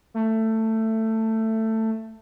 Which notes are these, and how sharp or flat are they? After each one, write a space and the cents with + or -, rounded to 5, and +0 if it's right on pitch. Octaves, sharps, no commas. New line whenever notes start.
A3 +15